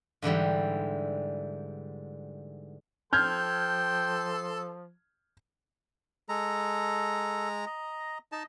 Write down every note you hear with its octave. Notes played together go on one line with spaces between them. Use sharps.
G#2 D3 E3 G3
F3 A4 G5 C6 F6 G6 G#6
G#3 A4 A#5
D#5 A#5
D#4 D#5 A5